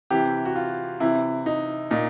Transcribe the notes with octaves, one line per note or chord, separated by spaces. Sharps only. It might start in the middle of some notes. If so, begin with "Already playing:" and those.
C3 E3 G4
F#4
F4
C3 E3 E4
D#4
A#2 D#4